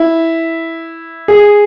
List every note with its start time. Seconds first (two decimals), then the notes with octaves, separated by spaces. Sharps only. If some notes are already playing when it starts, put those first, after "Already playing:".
Already playing: E4
1.28 G#4